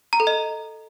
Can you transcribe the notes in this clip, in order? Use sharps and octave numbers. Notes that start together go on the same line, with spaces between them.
A#5
A4
D#5